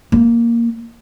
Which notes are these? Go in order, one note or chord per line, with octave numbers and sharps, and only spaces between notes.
A#3